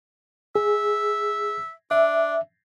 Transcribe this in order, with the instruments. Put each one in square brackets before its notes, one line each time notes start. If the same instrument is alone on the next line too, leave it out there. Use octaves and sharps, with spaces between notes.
[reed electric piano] G#4 [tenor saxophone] E5
[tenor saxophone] D4 [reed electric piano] E5